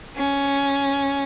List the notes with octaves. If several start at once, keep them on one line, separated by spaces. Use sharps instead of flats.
C#4